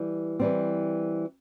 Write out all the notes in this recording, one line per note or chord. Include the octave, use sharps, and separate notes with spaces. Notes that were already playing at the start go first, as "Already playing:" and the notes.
Already playing: E3 G3
E3 G3 C4